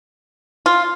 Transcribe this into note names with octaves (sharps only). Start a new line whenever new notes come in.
F4